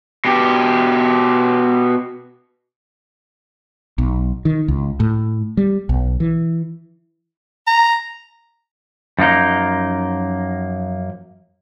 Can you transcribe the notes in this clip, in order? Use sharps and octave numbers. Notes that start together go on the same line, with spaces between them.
B2 G4
B1
D#3
C#2
A2
G3
B1
E3
A#5
F#2 F3 A#3 D#4